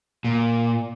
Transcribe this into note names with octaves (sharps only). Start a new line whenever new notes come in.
A#2